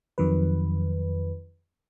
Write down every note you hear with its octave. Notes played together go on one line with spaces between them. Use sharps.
F2 D#3 F#3 B4